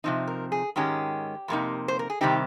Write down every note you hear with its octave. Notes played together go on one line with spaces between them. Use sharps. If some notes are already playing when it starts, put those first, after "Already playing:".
C3 F3 C4 D#4
A#4
G#4
G#2 D#3 G#3 C#4 G4
F2 C3 A#3 D#4
C5
A#4
G#4
C3 D#3 G3 C4 D#4 G4